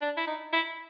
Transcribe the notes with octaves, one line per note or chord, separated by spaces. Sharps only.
D4
E4
D#4
E4